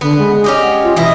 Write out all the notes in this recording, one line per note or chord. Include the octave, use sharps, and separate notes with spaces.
D3 B3
G#3
C#4 G4 D#5
F#5
F4
B2 E3 E4 D#5